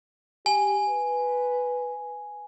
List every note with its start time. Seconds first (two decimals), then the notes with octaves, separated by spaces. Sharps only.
0.46 G4 G#5
0.89 B4